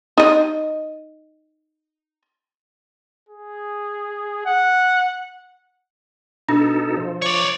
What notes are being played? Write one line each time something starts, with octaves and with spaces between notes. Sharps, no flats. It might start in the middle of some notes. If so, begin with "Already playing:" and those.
D#4 D#5
G#4
F#5
B2 D4 D#4 A4
F3
C#5 D5